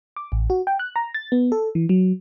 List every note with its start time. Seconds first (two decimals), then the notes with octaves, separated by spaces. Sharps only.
0.16 D6
0.32 A1
0.50 F#4
0.67 G5
0.79 F#6
0.96 A#5
1.14 A6
1.32 B3
1.52 A4
1.75 E3
1.89 F#3